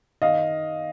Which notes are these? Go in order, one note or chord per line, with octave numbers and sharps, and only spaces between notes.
D#3 D#5 F5